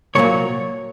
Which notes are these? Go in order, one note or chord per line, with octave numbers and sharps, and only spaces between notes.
C2 A#2 F#3 A#3 C#5